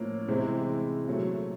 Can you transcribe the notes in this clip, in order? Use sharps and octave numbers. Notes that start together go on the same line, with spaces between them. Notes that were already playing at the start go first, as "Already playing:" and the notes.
Already playing: A2 F3 A#3 C#4
C3 E3 G#3 C4 E4
A#2 F#3 A3